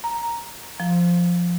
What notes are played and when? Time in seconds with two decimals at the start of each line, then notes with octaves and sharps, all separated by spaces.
0.04 A#5
0.80 F3